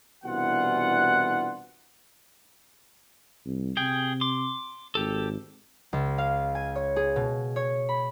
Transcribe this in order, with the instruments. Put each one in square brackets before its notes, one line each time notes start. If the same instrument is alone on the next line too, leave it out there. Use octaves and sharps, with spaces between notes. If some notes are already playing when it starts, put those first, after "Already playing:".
[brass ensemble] C2 B2 E3 D4 F4 F#5
[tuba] C2
[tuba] C3 [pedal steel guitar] G#4 G5
[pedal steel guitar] C6 D6
[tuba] G#1 [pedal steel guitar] G4 A4
[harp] C#2
F5
G#5
C#5
G#4
B2
C#5
B5